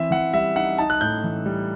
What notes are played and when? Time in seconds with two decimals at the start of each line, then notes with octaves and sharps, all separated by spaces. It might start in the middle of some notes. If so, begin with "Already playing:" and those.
Already playing: E3 C4 E5
0.11 E3 F#5
0.34 G3 E5
0.56 D#4 F#5
0.78 D#4 A5
0.90 F#6
1.01 A2 G6
1.24 E3
1.46 G3